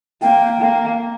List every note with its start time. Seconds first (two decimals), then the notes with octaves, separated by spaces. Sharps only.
0.22 A#3 G5
0.61 A#3